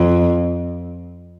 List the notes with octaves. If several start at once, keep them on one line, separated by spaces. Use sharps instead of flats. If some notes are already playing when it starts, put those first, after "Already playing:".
Already playing: F2